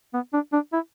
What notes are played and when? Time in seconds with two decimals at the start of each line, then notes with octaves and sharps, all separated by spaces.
0.14 B3
0.33 D4
0.53 D4
0.73 E4